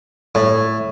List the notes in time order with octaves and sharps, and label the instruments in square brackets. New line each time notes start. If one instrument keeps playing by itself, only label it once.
[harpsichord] A2